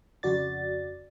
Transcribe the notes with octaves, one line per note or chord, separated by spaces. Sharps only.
F2 C#3 F#4 D5 A6